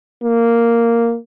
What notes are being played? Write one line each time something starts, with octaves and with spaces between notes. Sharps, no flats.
A#3